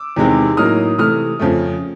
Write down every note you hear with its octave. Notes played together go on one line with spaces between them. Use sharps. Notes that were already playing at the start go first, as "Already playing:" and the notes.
Already playing: D6 E6
E2 C3 D#3 G#3 C4
A2 F#3 A#3 D#4 D#6 F6
C3 E3 A3 D#6 F6
F2 C#3 F3 A3